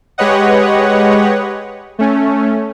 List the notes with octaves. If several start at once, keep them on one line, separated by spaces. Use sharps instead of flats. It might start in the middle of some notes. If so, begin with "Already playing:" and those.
G#3 G4 B4 C#5 D#5 F#5
A3 C#4